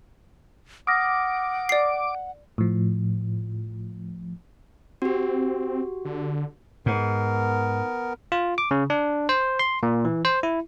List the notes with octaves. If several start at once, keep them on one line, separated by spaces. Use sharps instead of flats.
F#5 D6 D#6 F6 A#6
D5 C7
A2 F3
C4 F#4 G4
D3
G#2 B3 A#4
F4
D6
C#3
D4
C5
C6
A#2
E3
C5
E4